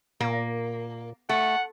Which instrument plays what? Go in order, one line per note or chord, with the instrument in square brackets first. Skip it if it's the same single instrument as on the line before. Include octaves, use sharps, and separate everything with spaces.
[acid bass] A#2 [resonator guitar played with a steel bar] A#3
[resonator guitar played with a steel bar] A3 [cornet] F#5